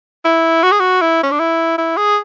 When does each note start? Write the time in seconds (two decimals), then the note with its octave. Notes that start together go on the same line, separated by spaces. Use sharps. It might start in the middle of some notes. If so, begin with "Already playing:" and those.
0.25 E4
0.63 F#4
0.72 G#4
0.80 F#4
1.01 E4
1.23 C#4
1.31 D4
1.39 E4
1.78 E4
1.97 G#4